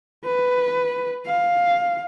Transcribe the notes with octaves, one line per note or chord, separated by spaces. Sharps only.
B4
F5